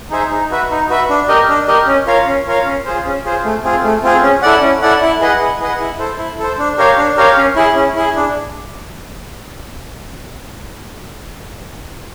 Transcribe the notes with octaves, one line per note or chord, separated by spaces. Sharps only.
D#4 G#4 C5 E5
D#4
F#4 B4 E5
D#4
F#4 B4 E5
D4
G4 A#4 D#5
D4
G4 A#4 D#5
C#4
F4 A#4 C#5 F5
C#4
F4 A#4 C#5 F5
C#4
F4 G#4 C5
C#4
F4 G#4 C5
A3
C4 F4 G#4
A3
C4 F4 G#4
C#4
E4 A4 D5 F#5
C#4
E4 A4 D5 F#5
E4
G#4 B4 D#5 F#5
E4
G#4 B4 D#5 F#5
E4
A4 C5
E4
A4 C5
D4
G4 A#4 C#5 F5
D4
G4 A#4 C#5 F5
C#4
E4 G#4
C#4
E4 G#4
D4